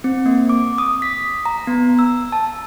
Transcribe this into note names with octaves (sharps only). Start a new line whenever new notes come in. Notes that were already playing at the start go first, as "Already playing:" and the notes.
C4
A#3
D6
D#6
B6
A#5
B3
E6
A5